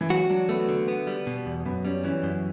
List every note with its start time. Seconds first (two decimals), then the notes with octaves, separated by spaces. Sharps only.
0.01 E3
0.10 F#3 F#4
0.30 F#3 D4
0.49 A3 B3
0.69 D3
0.88 B3
1.07 G3
1.27 B2
1.46 E2
1.66 F#2 B3
1.85 G3 C#4
2.04 E3 C#4
2.23 F#2